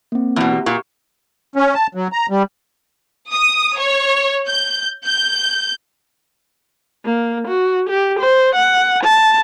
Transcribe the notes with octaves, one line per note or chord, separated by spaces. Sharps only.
A#3 C4
E2 B2
G4
A#2 C#6
C#4
A5
F#3
A#5
G3
D#6
C#5
G6
G6
A#3
F#4
G4
C5
F#5
A5